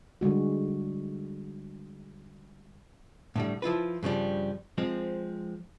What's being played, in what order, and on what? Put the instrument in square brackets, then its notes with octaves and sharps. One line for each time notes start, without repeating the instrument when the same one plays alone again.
[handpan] D3 G3 G#3 F#4
[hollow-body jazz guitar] A2 D3 G3
F3 E4 F4 B4
G2 C#3 F3 G3
F3 G#3 C4